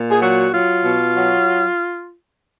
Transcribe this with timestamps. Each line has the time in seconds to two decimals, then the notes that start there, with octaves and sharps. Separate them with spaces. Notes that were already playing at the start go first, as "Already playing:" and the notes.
Already playing: A#2
0.11 G#4
0.21 F#3 F#4
0.53 F#3 F4
0.83 B2
1.14 F#3